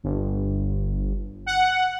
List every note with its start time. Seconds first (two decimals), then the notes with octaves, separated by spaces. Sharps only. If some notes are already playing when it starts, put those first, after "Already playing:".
0.03 G1
1.46 F#5